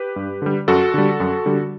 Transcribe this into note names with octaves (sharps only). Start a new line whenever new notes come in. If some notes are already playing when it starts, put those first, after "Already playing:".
Already playing: G4 B4
G2
D3 G3
F#2 F#4 A4
D3 G3
F#2
D3 G3